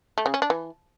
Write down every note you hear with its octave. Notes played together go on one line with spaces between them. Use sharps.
A3
C#3
C#4
D4
E3